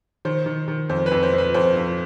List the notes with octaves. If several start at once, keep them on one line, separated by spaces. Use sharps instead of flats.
D#3 C5
D#3
D#3
F2 C5
B4
F2
C5
F2 B4
F2 C5
F2